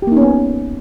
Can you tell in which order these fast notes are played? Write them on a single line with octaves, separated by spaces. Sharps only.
G4 A#3 D#4 C#4 B3